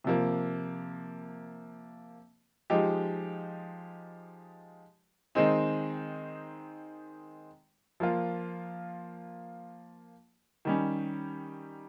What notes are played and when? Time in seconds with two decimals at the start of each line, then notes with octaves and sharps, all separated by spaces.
0.04 C3 F3 A#3
2.70 F3 G#3 D#4 G4
5.35 D#3 G#3 C4 D#4
8.00 F3 A#3 F4
10.65 D#3 G3 C#4